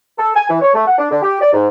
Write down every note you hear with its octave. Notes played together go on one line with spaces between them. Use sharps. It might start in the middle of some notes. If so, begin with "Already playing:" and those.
A4
G#5
E3
C#5
A3
F#5
D4
D3
G4
D5
G#2